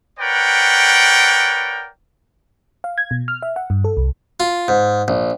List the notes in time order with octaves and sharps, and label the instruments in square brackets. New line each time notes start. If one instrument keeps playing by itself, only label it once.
[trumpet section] A#4 B4 C#5 D5 F#5 G5
[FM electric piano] F5
G#6
B2
F6
E5
F#5
G2
A4
C2
[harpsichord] F4
G#2
A#1